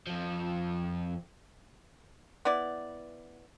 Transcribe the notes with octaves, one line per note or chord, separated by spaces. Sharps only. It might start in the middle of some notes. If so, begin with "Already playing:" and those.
F2 F3
B3 E4 D5